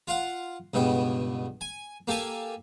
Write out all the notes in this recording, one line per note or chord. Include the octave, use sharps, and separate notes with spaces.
F4 F5 F#5
C#2 G2 B2 G5
G#5
A#3 G4 A4 G#5